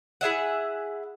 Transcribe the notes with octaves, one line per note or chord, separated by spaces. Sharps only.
E4 G#4 E5 F#5